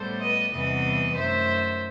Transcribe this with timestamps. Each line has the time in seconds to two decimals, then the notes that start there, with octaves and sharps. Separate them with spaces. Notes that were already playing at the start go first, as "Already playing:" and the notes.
Already playing: A2 G3 B3 A4 C5
0.21 B4 D#5
0.53 E2 C3 E3 G3 B3 B4 D#5
1.15 F#2 D#3 A3 C5 E5